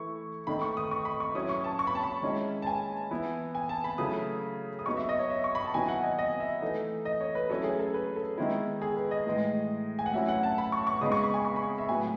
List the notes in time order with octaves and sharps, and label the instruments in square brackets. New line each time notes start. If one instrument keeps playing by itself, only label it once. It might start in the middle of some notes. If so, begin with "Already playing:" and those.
Already playing: [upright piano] E3 A3 E4 C#6
D#3 A3 D#4 B5
C#6
D#6
C#6
B5
C#6
F#3 C#4 E4 D#6
C#6
A5
C#6
B5
A5
B5
D#3 G#3 C#4 E4
A5
G#5
E3 B3 E4
G#5
A5
B5
C#3 F#3 A3 E4 D#6
D#6
F#3 B3 D#4 C#6
E5
D#5
C#5
E5
C#6
B5
A5
D#3 F#3 B3 E4 G#5
F#5
D#5
D#5
E5
E3 A3 D#4
D#5
C#5
B4
F#3 A3 C#4 E4 A4
G#4
A4
B4
A4
D#3 G#3 B3 E4
G#4
B4
D#5
A2 E3 G#3
G#5
F#5
A2 F#3 C#4 E4 E5
F#5
A5
B5
C#6
C#6
C#3 G#3 B3 D#4 D#6
C#6
B5
G#5
C#6
B5
E5
A2 F#3 B3 G#5